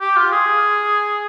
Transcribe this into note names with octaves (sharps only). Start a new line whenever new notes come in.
G4
F4
G#4